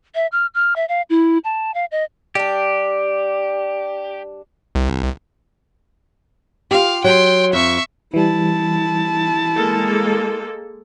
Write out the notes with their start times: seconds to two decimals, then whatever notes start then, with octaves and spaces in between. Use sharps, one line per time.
0.15 E5
0.32 F6
0.54 F6
0.76 E5
0.89 F5
1.10 E4
1.44 A5
1.74 F5
1.91 D#5
2.35 G3 D4 G4
4.75 C2
6.71 F4 G4 F5
7.04 F#3 G5 C6
7.53 F2 E5 C#6
8.14 E3 G3 E4 A5
9.56 G#3 A#3 A4